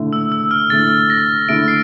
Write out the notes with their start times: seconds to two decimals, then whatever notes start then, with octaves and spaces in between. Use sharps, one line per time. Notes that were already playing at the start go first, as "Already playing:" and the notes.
Already playing: D3 A3 E4
0.13 E6
0.32 E6
0.51 F6
0.70 D3 A3 E4 A6
1.10 A#6
1.48 D3 A3 E4 D7
1.68 C7